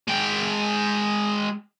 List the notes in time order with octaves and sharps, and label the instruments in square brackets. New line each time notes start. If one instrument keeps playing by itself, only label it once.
[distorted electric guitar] G#3 G5